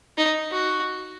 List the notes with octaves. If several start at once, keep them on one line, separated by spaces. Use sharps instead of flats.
D#4
F#4